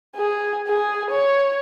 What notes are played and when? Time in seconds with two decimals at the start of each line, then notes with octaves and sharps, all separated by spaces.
0.16 G#4
0.68 G#4
1.11 C#5